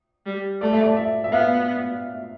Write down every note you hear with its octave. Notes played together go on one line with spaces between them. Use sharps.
G3
A3 D5
E5
D5
E5
E5
B3 F5